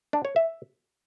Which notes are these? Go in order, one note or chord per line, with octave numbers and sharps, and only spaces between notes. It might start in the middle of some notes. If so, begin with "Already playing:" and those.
D4
C#5
E5